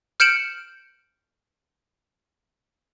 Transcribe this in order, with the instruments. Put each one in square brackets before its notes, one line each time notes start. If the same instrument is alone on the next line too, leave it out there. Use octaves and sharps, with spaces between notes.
[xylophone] F6 G6 C#7 D7 E7 F#7